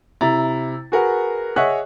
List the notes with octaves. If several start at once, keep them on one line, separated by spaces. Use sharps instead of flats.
C3 E4 A#5 A6
F#4 G#4 A#4 B4 F#5
G#4 C#5 D#5 E5 F#5 F#6